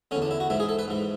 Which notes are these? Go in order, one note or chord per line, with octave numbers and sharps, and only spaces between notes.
E2 D3 C#4
D4
E4
F#4
G#2 E3 E4
G#4
A4
B4
G#2 E3